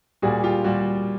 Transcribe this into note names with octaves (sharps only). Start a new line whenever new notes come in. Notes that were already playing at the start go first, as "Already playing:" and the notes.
A#2 G3 F#4 G#4
F4 G4
A#2 G3 F#4